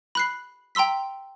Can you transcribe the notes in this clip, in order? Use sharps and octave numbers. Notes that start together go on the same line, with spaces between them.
B5 F#6 C7
G5 A#5 C6 E6 B6